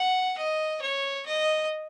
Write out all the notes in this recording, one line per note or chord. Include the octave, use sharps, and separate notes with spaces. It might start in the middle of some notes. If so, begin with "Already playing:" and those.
Already playing: F#5
D#5
C#5
D#5